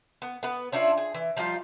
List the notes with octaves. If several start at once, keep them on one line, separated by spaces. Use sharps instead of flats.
B3
B3 B4
C#4 D4 E4 F4
G#4
E3
F3 G3 D#4 F4